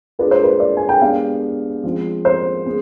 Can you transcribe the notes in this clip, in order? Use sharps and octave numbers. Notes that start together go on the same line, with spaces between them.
G#3 D4 F4 G#4 B4
C5
B4
D5
G#5
G5
G#3 B3 D4 G4 F5
F3 G#3 C4 F4
C5
G#3 B3